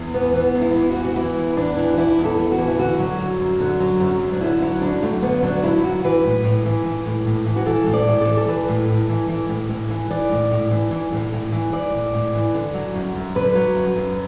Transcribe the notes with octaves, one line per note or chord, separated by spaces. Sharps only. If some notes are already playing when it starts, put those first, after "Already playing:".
Already playing: E2
E3 B3
E3 B3
E2
E4
E2
F#4
E3
F#4
E3 E4
E2
E2 D4
E3
F#4
E3 E4
E2
A4
E2
F#4
E3
E4
D3 F#4
F#3
F#2
F#2
D3
F#3
F#2
F#2
D4
D3 E4
F#3 E4
F#2 D4
F#2 A3
D3 B3
F#3 D4
F#2 E4
F#2 F#4
E3 B4
A2
A2
E3
E3
A2
A2
E3
F#4
E3 A4
A2
D5
A2
A4
E3
A4
E3 B4
A2
A2
E3
E3
A2
A2
E3
E3 D5
A2
A2
E3
E3
A2
A2
E3
E3 D5
A2
A2
E3
D3
F#3
F#2
F#2
D3 B4
F#3
F#2
F#2